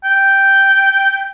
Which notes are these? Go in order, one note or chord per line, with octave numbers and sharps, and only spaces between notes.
G5